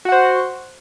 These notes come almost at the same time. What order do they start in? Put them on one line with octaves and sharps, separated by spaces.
F#4 F#5 C5